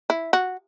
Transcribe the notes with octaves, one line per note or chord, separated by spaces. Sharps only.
E4
F#4